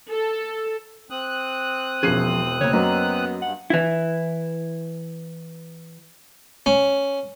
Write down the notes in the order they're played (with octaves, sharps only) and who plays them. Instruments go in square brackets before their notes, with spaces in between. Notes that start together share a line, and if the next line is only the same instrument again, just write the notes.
[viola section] A4
[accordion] C4 D#6 F#6
[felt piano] E1 C7 D#7 [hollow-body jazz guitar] F3 C#4 G#4
[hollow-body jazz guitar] C#3 A#3 [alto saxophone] C#5
[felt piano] F#2 F#3 A#3 [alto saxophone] B3 [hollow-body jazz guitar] D#5
[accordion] G2 [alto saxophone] F#5
[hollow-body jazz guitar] E3 E4
[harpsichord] C#4